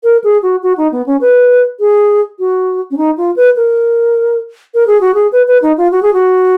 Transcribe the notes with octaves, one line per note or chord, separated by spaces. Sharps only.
A#4
G#4
F#4
F#4
D#4
B3
C#4
B4
G#4
F#4
C#4
D#4
F4
B4
A#4
A#4
G#4
F#4
G#4
B4
B4
D#4
F4
F#4
G#4
F#4